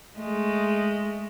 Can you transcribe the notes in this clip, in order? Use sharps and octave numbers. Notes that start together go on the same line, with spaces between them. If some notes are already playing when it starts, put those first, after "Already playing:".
G#3 A3